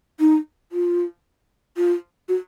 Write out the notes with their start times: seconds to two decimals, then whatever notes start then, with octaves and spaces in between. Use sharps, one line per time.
0.20 D#4
0.72 F4
1.77 F4
2.29 F#4